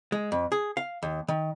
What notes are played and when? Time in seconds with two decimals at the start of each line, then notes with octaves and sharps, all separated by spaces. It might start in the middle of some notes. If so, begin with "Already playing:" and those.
0.12 G#3
0.32 F2
0.52 G#4
0.77 F5
1.03 D#2
1.28 D#3